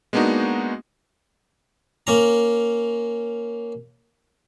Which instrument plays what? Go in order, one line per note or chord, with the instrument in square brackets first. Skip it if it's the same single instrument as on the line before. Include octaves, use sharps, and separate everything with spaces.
[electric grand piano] G#3 A#3 B3 D4 D#4 F#4
[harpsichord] A#3 C#4 A#5